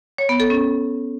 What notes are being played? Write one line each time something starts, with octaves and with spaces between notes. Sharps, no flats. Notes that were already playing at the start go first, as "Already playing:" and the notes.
C#5
B3
A4
C#4